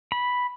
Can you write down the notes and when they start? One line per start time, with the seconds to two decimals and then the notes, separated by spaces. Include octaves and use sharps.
0.12 B5